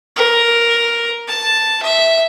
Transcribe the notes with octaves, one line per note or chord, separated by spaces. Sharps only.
A#4
A5
E5